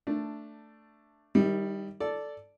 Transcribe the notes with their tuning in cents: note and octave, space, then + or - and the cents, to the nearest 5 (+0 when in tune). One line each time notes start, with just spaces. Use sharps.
A3 +10 D4 +0
D#3 +0 G3 +5 E4 -35
A4 +0 D5 -5